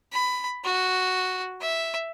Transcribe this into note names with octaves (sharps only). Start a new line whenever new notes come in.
B5
F#4
E5